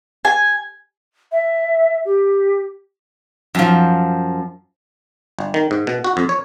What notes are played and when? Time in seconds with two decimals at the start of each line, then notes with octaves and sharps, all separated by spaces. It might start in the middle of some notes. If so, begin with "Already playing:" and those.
0.25 G#5
1.32 E5
2.05 G4
3.55 F#2 F3
5.39 G1
5.54 D#3
5.71 G#2
5.87 B2
6.04 F#4
6.17 F2
6.29 C#5